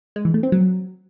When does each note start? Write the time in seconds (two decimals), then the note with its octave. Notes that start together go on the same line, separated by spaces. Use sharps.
0.16 G#3
0.25 E3
0.34 A3
0.43 C4
0.52 F#3